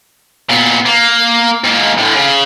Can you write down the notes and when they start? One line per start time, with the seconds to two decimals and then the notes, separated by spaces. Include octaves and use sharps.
0.49 A#2 B3
0.86 A#3
1.64 G#2 A#3
1.98 A2 D3
2.16 C#3